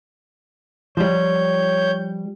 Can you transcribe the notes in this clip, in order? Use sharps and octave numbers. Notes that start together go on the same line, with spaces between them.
F3 G3 C#5 G6